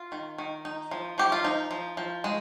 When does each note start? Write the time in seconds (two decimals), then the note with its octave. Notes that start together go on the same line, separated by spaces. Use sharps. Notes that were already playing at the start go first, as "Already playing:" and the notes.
Already playing: F4
0.12 D#3
0.38 D#3
0.65 D#4
0.91 F3
1.18 F3 G4
1.32 F4
1.44 F3 D#4
1.71 F3
1.97 F3
2.24 G#3